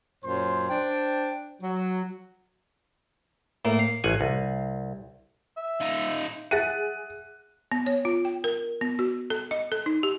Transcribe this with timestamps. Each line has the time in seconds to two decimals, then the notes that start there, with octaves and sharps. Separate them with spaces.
0.23 F#2 A#2 C#4 C5 C6
0.69 D4 C5 G5
1.61 F#3
3.65 A2 A#3
3.79 F5
4.04 A1 F#5 G#5
4.21 C2
5.57 E5
5.81 D#4 F4
6.51 G#4 E5 F#5 F#6 A6 D#7
7.72 B3
7.86 C#5
8.05 F4
8.25 G5
8.44 A#4
8.81 B3
8.99 F#4
9.30 A4
9.51 D#5
9.72 A4
9.86 D#4
10.03 G4